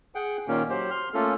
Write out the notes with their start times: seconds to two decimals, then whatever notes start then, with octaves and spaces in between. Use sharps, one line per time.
0.15 G#4 F#5 G5
0.48 A#2 D#3 A#3 C#4
0.70 F#3 G4 C5
0.90 C6 F6
1.14 A3 A#3 C#4 F4 A4